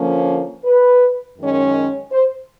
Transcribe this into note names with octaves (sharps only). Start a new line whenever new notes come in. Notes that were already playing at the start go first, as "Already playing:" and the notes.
Already playing: D3 F3 A#3 C#4
B4
F#2 D#3 G#3 C#4
C5